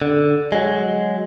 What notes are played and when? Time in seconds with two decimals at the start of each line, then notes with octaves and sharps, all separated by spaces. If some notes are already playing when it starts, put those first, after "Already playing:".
0.02 D3
0.52 F#3 G#3